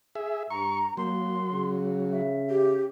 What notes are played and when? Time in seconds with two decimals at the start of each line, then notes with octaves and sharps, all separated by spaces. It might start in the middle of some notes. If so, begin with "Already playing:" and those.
0.15 G#4 E5
0.50 G2 A#5 C#6
0.97 F#3 A#3 C6
1.53 C#3
2.12 E5
2.50 G4